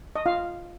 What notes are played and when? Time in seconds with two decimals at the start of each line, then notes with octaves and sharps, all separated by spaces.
0.16 D#5
0.26 F4 F5